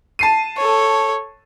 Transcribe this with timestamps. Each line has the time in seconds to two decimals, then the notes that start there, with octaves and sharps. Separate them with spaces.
0.19 A5 C7 D#7
0.57 A4 C#5